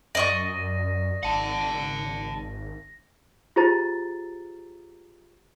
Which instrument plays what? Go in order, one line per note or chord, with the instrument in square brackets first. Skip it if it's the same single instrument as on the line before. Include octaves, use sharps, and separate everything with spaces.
[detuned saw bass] F#2 [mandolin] D5 D#5 C#6 [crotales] A#6
[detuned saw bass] G#1 [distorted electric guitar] F#5 A5
[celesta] F4 G4 G#4 C5 A#5 A6